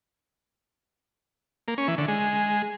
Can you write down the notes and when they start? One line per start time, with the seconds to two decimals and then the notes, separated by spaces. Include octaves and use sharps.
1.68 A#3
1.78 C#4
1.88 E3
1.98 D3
2.08 G#3